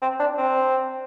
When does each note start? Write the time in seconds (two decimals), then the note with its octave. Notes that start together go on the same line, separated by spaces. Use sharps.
0.02 C4
0.20 D4
0.38 C4